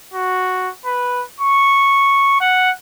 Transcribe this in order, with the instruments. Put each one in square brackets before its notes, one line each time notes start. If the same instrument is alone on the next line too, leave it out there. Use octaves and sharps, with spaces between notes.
[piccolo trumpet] F#4
B4
C#6
F#5